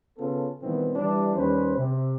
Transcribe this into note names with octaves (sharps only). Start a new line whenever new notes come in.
C#3 B3 C#4 F4 A4
A#2 D#3 E3 G3 B3 C4
E3 G3 D4
D#2 G3 C#4 B4 C5
C3